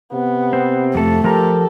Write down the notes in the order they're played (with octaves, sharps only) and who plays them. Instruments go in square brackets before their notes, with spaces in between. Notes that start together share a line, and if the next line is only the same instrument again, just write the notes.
[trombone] C3 [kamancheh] B3
[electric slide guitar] C4
[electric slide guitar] F2 A4 [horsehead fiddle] A3
[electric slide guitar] F3 A#4 A#5 [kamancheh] G4 A4